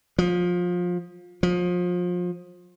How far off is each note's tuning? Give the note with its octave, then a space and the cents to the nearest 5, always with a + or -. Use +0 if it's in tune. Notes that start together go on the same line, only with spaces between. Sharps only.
F3 +25
F3 +30